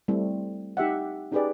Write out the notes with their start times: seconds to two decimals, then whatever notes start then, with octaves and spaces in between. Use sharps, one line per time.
0.08 G3 A3 C4 E4
0.77 D#4 G4 E5 F#5
1.32 C#4 D#4 G4 G#4 B4 D5